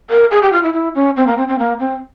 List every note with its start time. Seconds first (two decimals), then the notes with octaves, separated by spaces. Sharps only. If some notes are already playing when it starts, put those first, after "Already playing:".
0.10 A#4
0.31 G#4
0.42 G4
0.53 F4
0.63 E4
0.74 E4
0.95 C#4
1.17 C4
1.27 A#3
1.37 C4
1.48 C4
1.59 A#3
1.80 C4